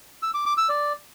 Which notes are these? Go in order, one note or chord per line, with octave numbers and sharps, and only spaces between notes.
E6
D6
D6
E6
D5